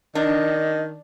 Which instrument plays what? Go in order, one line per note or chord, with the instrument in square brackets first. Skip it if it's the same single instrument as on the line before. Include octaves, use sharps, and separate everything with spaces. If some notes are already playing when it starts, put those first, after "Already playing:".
[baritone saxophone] D#3 [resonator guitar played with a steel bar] D4 [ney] D#5